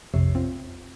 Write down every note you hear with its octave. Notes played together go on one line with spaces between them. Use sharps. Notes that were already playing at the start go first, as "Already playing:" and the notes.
A#1 F2 C3 C#5 E5 C7
C4 F4